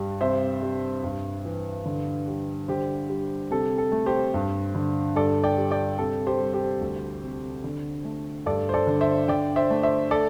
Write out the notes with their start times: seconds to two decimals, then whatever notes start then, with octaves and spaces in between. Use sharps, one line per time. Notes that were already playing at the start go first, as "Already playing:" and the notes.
Already playing: G2 G3
0.21 C3 C5 E5
0.62 G3
1.04 G2
1.45 E3
1.86 D3
2.27 G3
2.68 D3 G4 C5
3.09 G3
3.51 C3 A4
3.78 A4
3.92 A3
4.06 G4 C5
4.34 G2
4.75 D3
5.16 G2 A4 D5
5.44 D5 G5
5.58 G3
5.71 D5 G5
5.98 C3 A4
6.27 G4 C5
6.40 G3
6.53 G4 C5
6.81 D2
7.23 C3
7.64 D3
8.05 A3
8.46 G2 A4 D5
8.69 C5
8.74 A4 D5
8.87 D3
9.01 C5 E5
9.28 D3 D5 G5
9.56 C5 E5
9.70 A3
9.83 C5 E5
10.11 A4 D5